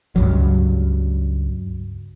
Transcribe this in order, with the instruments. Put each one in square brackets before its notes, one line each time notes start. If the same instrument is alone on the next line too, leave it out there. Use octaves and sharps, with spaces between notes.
[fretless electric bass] C#2 G2 F#3